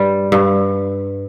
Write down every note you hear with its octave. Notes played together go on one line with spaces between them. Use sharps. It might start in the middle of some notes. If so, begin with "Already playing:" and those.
Already playing: G2 G3
G2